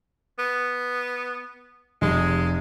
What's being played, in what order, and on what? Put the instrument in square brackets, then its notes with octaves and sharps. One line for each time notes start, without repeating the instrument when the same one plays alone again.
[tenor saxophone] B3
[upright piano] F1 [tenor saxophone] G#3